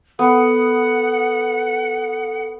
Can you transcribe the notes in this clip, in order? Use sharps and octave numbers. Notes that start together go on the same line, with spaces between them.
B3 A4 F#5